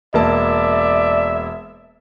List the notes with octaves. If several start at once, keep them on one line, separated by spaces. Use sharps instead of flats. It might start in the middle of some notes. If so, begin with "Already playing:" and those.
E1 A#3 D5 E5 A5